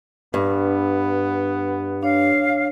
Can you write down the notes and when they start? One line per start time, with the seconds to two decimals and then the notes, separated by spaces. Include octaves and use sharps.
0.34 G2 B3
2.03 D4 C#5 F5